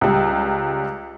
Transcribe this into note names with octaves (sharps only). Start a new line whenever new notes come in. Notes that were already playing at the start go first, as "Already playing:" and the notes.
C#2 G3